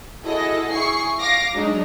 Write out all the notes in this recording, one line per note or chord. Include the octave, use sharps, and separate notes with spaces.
E4 F#4 G#4 A4 D#5
E4 G#4 C#6 C7
F5 D6 A#6 C7
F#3 G#3 D4 D#4